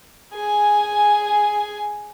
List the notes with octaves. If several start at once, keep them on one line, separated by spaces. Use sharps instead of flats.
G#4 G#5